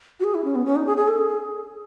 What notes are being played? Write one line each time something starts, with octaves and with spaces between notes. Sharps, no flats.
F#4
G#4
E4
C#4
B3
C#4
D#4
G#4
G#4
A4
G#4